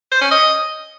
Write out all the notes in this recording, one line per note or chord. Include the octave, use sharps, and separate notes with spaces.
C5
C#4
D#5